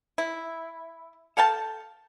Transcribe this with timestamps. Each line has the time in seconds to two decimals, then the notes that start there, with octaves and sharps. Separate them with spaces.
0.18 E4
1.37 A4 F5 G5 A5